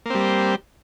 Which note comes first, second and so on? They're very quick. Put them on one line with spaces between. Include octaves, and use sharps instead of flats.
A#3 C4 G3